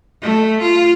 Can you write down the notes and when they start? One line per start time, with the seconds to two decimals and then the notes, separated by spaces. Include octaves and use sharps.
0.22 A3
0.61 F4